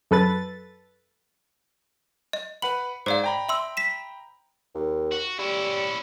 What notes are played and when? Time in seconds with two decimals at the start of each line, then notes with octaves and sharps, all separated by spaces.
0.11 F#2 A4 B4 A6
2.33 D#5
2.62 B4 F#5 B5 F#7
3.06 G#2 C5 D5 F5
3.24 G5 A#5 B5
3.49 E5 C6 E6
3.77 B6 E7
4.75 D#2
5.11 F#4
5.39 G3 C#4 E4